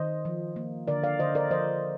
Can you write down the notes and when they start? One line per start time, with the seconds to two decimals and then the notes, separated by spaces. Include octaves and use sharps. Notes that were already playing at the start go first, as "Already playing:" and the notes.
Already playing: D#3 C5 D#5
0.25 F3
0.56 A#3
0.87 D3 A#4 D5
1.03 D5 F5
1.19 D3 C5 D#5
1.35 A#4 D5
1.51 F3 C5 D#5